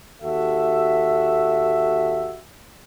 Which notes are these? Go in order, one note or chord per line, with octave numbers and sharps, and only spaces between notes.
D#2 F#4 G4 A4 E5